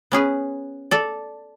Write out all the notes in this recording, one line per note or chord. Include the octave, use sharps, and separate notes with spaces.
B3 C#4 G#4 B4
A4 D5